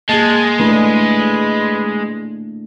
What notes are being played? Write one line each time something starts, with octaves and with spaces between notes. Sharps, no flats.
G#3 A#3 G#4 A5
A3 D4 E4 B4